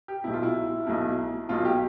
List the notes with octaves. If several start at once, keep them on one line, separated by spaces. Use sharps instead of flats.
G4
B1 B2 E4
F4
E4
B1 B2
B1 B2 F4
G4